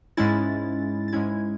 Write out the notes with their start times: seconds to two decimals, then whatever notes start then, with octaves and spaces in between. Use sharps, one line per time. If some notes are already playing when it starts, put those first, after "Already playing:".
0.17 G#2 G#3 C#4 E4 A6
1.08 A6
1.12 G#2 G#3 C#4 E4 G#6